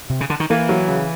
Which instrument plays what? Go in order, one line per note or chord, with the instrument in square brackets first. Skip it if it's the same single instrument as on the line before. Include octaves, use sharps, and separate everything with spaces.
[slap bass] C3
C#3
D3
D#3
[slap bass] E3 [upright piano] A#3
[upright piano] F#3
C#3